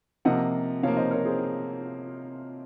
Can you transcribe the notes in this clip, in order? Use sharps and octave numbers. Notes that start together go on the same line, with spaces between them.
C3 F3 A#3 D#5 F#5
C3 F3 A#3 C#5 F5
C5 D#5
A#4 C#5
G#4 C5